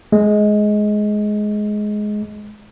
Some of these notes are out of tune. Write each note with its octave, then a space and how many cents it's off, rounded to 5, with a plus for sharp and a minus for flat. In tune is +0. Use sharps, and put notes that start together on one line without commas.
G#3 +15